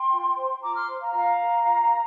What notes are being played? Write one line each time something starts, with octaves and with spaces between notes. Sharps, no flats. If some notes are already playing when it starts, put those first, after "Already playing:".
Already playing: G5 C6
F4
C5
F4 A#5 D6
C6 F6
C5
F5 A#5
F4 F5 A#5
A#4
F4
A#4